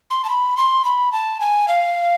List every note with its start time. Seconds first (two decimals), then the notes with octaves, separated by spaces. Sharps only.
0.10 C6
0.24 A5
0.29 B5
0.57 C6
0.85 B5
1.12 A5
1.40 G#5
1.68 F5